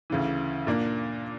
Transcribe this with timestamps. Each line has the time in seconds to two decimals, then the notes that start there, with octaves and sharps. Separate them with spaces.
0.10 D2 C#3 E3
0.67 A#2 A#3 D4